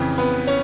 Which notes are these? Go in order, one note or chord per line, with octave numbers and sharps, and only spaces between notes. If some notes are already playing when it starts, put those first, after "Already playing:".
Already playing: F2 C#3 E3
B3 B4
C#4 C#5